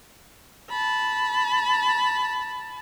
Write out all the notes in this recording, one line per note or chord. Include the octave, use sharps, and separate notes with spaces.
A5 B5